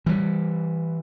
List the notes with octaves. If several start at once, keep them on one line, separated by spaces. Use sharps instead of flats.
E3 G3